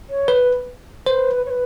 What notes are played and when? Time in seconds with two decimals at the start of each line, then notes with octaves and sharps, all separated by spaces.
0.09 C#5
0.28 B4
1.06 B4 C5
1.45 C#5
1.50 B4